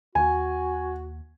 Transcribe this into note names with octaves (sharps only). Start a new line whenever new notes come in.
D#2 F#4 G#5